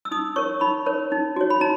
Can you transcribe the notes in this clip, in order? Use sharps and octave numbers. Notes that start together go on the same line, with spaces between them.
E6
D#4 D#6
A#4 C#5 C#6
D#4 B5
A#4 C#5
D#4
F#4 C#5
B5
D#4 A#5